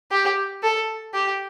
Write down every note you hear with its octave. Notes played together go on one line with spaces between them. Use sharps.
G4
A4
G4